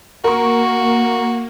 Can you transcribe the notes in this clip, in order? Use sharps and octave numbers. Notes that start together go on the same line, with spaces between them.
A#3 F#4 A#4 C#6